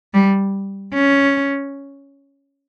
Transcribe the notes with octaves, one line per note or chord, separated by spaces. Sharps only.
G3
C#4